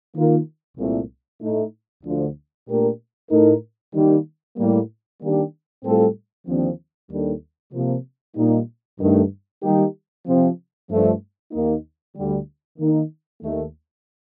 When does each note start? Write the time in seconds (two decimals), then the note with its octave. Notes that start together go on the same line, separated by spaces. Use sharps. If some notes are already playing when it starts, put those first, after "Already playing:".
0.15 D#3 A#3 F4 A#4
0.78 C2 A#2 A3
1.41 A2 A3 D#4
2.04 D2 D3 F3
2.67 A#2 A3 D4 G4 A#4
3.30 A2 A3 D#4 A#4
3.94 D#3 G3 A#3
4.57 A2 G3 A#3
5.20 D#3 G3 A#3 D4 G4
5.83 A2 G3 C4 F4 A4
6.47 D#2 D3 F3 C4
7.10 D#2 D#3 G3 D4 A4
7.73 C3 F3 A#3
8.36 A#2 G3 A#3 D#4
8.99 G2 D#3 A3
9.62 D#3 G3 A#3 D#4 G4
10.26 C3 F3 C4
10.89 G2 F3 A3 D4
11.52 D#2 D#3 A#3 D#4
12.15 D2 D3 G3
12.79 D#3 A#3 D#4
13.42 D#2 D#3 A3